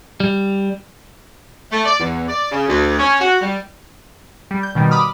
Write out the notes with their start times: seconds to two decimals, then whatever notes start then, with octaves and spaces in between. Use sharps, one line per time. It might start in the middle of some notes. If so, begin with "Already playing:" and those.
0.20 G3
1.72 A3
1.86 D5
2.00 E2
2.29 D5
2.51 C#3
2.68 D2
2.99 C#4
3.20 F#4
3.41 G3
4.51 G3
4.63 G6
4.75 B2 D#3 G3
4.91 B5 D6 D#6 F6